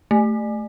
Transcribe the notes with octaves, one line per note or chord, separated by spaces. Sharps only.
A3